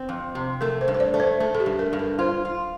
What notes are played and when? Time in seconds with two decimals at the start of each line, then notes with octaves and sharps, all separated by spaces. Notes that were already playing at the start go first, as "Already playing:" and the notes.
Already playing: C4
0.09 F2
0.35 C3
0.61 A3 A#4
0.81 C5
0.88 G2
0.94 C5
1.00 D5
1.14 A3
1.20 C5
1.40 A3 A4
1.55 A4
1.60 G4
1.66 G2
1.79 A#4
1.93 G2
1.99 A#4
2.19 F4 C5
2.45 F4